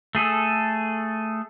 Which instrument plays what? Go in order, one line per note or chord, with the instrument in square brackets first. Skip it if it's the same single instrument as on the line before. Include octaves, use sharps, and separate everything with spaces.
[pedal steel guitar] A3 G#4 A4